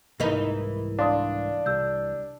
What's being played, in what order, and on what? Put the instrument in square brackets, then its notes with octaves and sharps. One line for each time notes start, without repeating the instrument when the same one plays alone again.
[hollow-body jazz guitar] C2 G#2 A#3 [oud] E3 D#4
[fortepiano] D4 [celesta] F5 C6 D#6
[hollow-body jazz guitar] C2 [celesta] G4 E6 G6